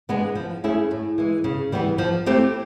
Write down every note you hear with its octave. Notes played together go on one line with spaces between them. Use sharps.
G#3 B3 D4
F3
A3 C#4 E4 G#4
A2
E3 G#3
C#3
E3 G3 B3
F3
A3 C4 E4 G4